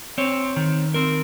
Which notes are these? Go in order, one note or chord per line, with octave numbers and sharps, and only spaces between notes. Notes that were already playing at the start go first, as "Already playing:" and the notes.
C4 C#5
D#3
C4 A#4